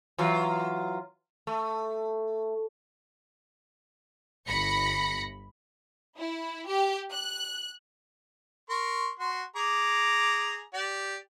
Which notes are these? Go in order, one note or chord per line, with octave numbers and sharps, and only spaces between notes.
E3 F#3 F4
A3
G1 B5 A#6 C#7
E4
G4
F#6
A#4 C6 C#6
F#4 C6
G#4 A#5 D6
G4 D5